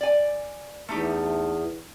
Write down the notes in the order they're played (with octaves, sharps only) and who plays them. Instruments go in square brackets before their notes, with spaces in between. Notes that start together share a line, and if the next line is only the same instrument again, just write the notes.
[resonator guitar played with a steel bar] D5 G#5
[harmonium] E2 [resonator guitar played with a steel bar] A3 D#4 G4